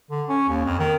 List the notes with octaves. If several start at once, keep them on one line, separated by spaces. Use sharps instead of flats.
D3
C#4
D#2
F2
D#3